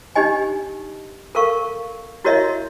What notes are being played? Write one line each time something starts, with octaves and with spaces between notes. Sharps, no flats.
D4 D#4 G4 D#5 G#5
A4 A#4 F5 C#6
E4 F#4 A#4 C#5 D#5 E5